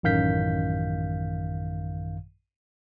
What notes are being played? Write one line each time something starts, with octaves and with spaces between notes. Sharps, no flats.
A1 F#2 D#3 F5 G6 B6